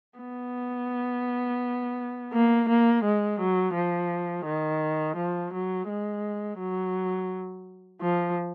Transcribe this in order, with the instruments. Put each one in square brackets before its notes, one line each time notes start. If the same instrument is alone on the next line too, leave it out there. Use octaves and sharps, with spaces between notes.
[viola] B3
A#3
A#3
G#3
F#3
F3
D#3
F3
F#3
G#3
F#3
F3